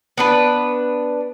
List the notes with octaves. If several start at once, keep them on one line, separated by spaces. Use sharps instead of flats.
B3 D4 B4